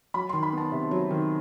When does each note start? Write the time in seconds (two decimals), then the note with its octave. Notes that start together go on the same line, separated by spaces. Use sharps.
0.14 F#3 B5
0.29 D#3 C6
0.43 B5
0.53 B3 A5
0.72 C3
0.91 F#3
1.11 D#3